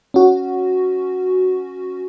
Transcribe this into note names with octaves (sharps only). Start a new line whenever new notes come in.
C#4 F#4